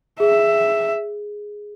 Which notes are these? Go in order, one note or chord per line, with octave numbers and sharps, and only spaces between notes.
G#4 E5